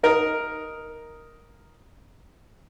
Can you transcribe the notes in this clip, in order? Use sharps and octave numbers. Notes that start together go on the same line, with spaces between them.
D#4 A#4